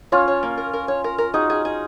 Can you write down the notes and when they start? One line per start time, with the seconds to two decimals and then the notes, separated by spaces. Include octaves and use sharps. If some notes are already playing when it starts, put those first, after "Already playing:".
0.12 C#4 F4 C#5
0.28 C#5
0.43 A#3
0.58 A#4
0.73 A#4
0.88 C#5
1.04 A#4
1.18 A#4
1.34 D#4 F#4 G#4
1.50 G#4
1.65 G#4